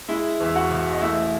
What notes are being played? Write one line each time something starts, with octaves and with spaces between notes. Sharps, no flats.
G#3 E4 E5
E2
E5
F#4 F#5
E1
D#5
A3 E4 E5